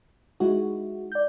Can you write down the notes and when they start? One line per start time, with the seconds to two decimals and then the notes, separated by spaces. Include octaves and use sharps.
0.40 G#3 D#4 E4 F#4
1.12 D5 G6